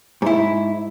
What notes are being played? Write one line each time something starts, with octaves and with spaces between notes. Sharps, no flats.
G#2 E4